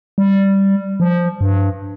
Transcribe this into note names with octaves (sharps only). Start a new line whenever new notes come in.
G3
F3
G2